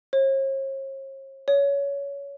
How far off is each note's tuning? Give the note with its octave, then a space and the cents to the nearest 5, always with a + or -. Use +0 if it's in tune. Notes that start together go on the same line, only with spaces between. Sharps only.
C#5 -45
C#5 +20